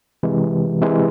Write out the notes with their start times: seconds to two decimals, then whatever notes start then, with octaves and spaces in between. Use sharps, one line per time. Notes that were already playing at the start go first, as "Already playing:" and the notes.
0.23 C3 E3 G#3
0.81 C3 E3 G#3